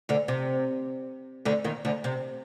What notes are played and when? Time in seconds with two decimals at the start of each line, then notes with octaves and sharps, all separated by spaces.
0.09 D2 D3
0.28 C3
1.45 D2 D3
1.64 D#2 D#3
1.85 D2 D3
2.04 C3